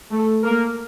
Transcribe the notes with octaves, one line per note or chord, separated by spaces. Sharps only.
A3 A4
A#3 A#4